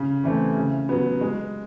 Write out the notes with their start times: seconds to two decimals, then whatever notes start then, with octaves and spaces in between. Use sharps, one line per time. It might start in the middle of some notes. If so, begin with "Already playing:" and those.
Already playing: C#3
0.24 E3 A3 C4
0.57 C#3
0.89 F#3 B3
1.21 G#3